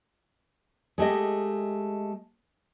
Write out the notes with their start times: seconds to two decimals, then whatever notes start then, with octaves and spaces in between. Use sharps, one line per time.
0.98 G#3 A3 G4 D#5